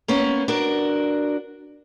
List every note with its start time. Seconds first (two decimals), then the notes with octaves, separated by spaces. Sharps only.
0.08 A#3 B3 C#4
0.48 D4 F#4 A#4